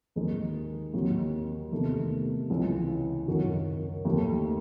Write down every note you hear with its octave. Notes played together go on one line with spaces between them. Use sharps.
D#2 D#3 G#3 D#4
D#2 D#3 F#3
E2 C3 D#3 A3
C#2 C#3 E3
F#2 D#3 F#3
D#2 D#3 A3